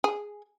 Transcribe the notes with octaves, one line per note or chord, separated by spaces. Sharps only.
G#4